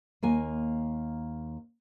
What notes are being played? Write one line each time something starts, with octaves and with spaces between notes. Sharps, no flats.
D#2 A#3 G#5